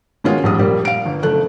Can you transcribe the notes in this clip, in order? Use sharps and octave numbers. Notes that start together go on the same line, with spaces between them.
B2 D#3 G#3 C#4 F4
A#1 G3 D#6
A#1 G3 A#3
F5 D7
G1
F#1 A3 F#6